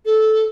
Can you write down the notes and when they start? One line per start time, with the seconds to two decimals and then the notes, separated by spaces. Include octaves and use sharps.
0.06 A4